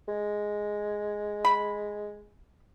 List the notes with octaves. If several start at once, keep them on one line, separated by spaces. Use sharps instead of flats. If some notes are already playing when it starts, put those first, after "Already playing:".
G#3
B5